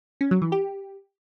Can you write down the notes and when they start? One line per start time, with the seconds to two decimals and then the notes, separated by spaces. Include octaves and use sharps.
0.21 C#4
0.31 F#3
0.42 E3
0.52 G4